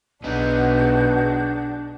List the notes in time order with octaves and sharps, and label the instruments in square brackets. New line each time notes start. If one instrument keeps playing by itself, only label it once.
[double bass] B1 [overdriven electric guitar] B3 D#4 [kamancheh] D4 [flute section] F#4 G#4 G6